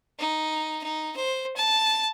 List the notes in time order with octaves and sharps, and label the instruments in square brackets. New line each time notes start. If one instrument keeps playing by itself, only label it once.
[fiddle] D#4
D#4
C5
A5